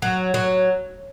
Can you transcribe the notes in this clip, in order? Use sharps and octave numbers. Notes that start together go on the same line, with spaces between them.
F#3
F#3